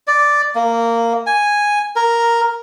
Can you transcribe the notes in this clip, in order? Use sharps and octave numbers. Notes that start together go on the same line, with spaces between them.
D5
A#3
G#5
A#4